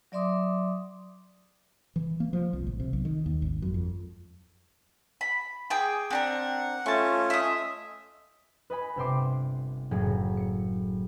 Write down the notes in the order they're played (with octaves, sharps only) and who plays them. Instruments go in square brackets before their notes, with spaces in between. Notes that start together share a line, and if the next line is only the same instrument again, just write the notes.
[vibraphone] F#3 D5 E5 C6 D6 D#6
[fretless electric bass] E3
A#3
F3
C2
A1
C3
B1
D#3
D#2
G#1
F#2
F2
[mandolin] B5
G#4 G5 D6
[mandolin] C4 D4 A#4 [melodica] F#5
[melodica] A3 C#4 F4 [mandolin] A5 C#6
[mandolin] D#5 E5
[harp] B4 D#5 G#5 B5
G1 C3 E5 G5 C6 D6
F#1 A2 F#3 A#3 G#4
C#7